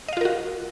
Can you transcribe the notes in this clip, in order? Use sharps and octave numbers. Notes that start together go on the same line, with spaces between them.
F4 F#4 A#4 D#5 F5